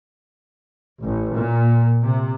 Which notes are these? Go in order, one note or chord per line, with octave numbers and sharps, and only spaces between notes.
A1
A#2
C3